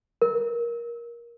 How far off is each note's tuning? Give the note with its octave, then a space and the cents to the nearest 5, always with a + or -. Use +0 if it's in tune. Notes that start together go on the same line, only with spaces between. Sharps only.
A#4 +15